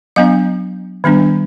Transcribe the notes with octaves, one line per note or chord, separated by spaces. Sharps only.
F#3 B3 D4 D#5 F5
D#3 G3 B3 D4